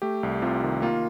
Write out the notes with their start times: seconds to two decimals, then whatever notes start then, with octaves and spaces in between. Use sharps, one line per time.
0.02 A3 G4
0.23 C2
0.42 C3 F4
0.63 D#3
0.82 A#3 F4